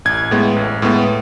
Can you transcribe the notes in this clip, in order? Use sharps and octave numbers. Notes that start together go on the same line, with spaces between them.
A1 G#6
A2 G#3 B3
A1
A2 G#3 B3